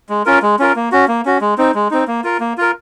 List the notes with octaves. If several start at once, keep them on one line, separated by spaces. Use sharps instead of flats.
G#3
C#4 F4 A#4
G#3
C#4 F4 A#4
A#3
C#4 F#4
A#3
C#4 F#4
G#3
C4 D#4
G#3
C4 D#4
A#3
F4 A#4
A#3
F4 A#4